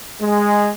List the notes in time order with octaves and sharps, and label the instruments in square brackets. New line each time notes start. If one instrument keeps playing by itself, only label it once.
[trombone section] G#3